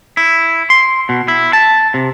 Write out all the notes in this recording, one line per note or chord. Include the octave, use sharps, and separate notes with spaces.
E4
C6
B2
E4
A5
C3